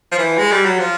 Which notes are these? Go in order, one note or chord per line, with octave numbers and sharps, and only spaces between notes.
F3
E3
G#3
G3
F#3
F3